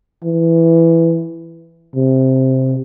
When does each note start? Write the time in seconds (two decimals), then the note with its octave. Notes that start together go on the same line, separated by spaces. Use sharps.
0.24 E3
1.96 C3